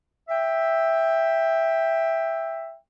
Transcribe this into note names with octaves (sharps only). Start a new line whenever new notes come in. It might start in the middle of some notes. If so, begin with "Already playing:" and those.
E5 G5